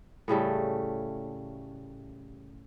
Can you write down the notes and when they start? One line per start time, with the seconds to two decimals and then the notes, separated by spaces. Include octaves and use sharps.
0.28 A2 C#3 G3 A3